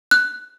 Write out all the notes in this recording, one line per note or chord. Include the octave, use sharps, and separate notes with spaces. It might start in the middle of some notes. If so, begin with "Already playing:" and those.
F#6